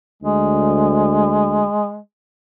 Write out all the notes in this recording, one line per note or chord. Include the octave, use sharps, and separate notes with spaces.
D2 G#3